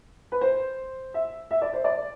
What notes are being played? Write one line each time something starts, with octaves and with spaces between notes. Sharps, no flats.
B4
C5
E5
E5
D5
C5
D5